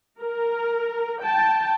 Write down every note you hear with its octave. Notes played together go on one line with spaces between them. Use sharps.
A#4
G5 A5